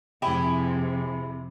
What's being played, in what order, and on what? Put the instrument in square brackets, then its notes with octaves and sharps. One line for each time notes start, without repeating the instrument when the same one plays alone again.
[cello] F2 C3 [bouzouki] E4 G4 G#4